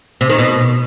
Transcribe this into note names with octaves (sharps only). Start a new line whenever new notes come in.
C3
D#3
B2